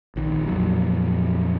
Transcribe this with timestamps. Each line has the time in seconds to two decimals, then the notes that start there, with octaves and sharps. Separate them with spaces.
0.16 A#1 D#3
0.48 F2 A#2 F#3